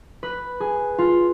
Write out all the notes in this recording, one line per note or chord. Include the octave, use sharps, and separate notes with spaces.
B4
G#4
F4